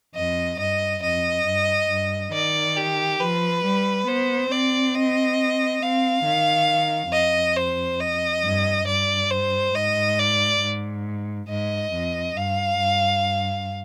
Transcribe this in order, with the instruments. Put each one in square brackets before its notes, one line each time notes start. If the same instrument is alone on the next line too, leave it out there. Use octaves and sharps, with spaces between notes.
[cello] F2 [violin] D#5
[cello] G2 [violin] D#5
[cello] F2 [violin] D#5
[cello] G2
G2
[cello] D#3 [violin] D5
[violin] G4
[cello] F3 [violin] B4
[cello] G3
[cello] B3 [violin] C5
[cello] C4 [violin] D5
[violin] D#5
[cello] C4 [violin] F5
[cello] D#3
[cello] F2 [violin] D#5
[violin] C5
D#5
[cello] G2
[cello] G2 [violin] D5
[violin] C5
[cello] G#2 [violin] D#5
[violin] D5
[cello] G#2
[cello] G#2 [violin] D#5
[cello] F2
[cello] G2 [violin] F5
[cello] G2